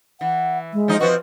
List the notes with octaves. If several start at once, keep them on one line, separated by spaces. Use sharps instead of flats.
E3 F#5
G#3
F3 D#4
F3 C4 F#4 B4